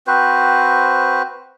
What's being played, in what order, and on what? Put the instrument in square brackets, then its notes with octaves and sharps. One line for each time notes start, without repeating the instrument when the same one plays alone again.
[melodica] C4 F#4 B4 C5